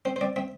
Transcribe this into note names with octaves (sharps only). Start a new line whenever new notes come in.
C4 C5
C5
C4 D5
C4 E5